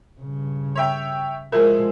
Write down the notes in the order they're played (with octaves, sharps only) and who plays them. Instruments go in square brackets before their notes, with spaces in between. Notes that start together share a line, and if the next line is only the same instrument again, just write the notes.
[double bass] G2 C#3
[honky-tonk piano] C#5 E5 G5
[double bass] F3 G#3 [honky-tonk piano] E4 G#4 [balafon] A#4